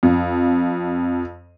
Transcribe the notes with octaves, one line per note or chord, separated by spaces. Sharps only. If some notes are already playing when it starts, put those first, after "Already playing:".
F2